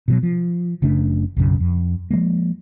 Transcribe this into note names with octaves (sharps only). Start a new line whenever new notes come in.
B2 E3 F#3
F3
F#1 C#3 A3 D4
B1 F#2 C#3
F2
F3 F#3 G#3 A#3